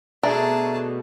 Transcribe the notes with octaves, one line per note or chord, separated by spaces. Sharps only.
B2 A3 D4 G#4 E5 A5 A#5